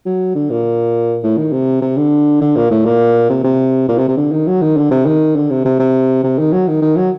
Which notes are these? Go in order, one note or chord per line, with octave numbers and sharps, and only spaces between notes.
F#3
D3
A#2
A2
D#3
C3
C3
D3
D3
A#2
A2
A#2
C3
C3
A#2
C3
C3
D3
D#3
F#3
D#3
D3
C3
D#3
D3
C3
C3
C3
C3
D#3
F#3
D#3
D#3
F#3